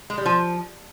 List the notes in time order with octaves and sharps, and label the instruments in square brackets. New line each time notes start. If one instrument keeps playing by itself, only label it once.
[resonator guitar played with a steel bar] G#3
G3
F3